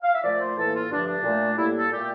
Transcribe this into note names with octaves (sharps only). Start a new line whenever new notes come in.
F5
E5
A#2 F3 A3 D5
C5
A2 E3 A#3 A4
F4
G2 D3 F3 A3 D4
D4
A#2 A3
A2 G3 A#3 E4
A4
A#2 A3 G4